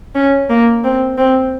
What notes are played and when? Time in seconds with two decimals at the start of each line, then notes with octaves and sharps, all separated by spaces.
0.15 C#4
0.50 A#3
0.84 C4
1.18 C4